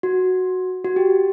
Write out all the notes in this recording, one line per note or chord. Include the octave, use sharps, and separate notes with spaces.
F#4
F#4
G4